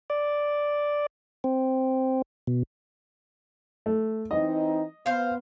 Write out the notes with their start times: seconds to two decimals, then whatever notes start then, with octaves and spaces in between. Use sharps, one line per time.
0.10 D5
1.44 C4
2.47 B2
3.86 A3
4.31 E3 C4 D#4 D#5
5.06 B3 C5 F5